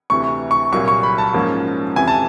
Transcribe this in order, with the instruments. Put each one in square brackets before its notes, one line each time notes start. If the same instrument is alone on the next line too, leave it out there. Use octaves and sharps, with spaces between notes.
[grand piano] D2 C3 E3 C#6
C#6
C2 A#2 F#3 A#3 C#6
C#6
B5
A5
G#2 F3 A#3 C#4
F2 C3 E3 G#5
A5